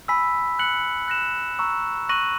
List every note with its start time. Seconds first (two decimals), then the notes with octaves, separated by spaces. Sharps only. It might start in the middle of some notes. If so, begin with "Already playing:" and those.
0.08 G#5 B5 E6 B6
0.59 F#6 C#7 F#7
1.08 F#6 A#6 E7
1.59 A#5 C#6 E6
2.09 C#6 F#6 A#6 D#7 F#7